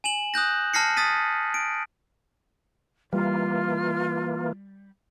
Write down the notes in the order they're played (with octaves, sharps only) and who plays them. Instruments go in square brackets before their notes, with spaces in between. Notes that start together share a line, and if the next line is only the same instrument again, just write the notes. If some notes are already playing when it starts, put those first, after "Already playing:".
[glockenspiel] G#5 E7 F#7
D#6 F#6 G6 A#6
A5 F6 A#6 C7 C#7
D#6 A6 B6 D#7
D7
[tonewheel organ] E3 A#3 [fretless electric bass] G3 [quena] F4